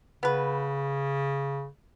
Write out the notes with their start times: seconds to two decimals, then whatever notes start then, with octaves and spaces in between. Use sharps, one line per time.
0.23 C#3 B3 B4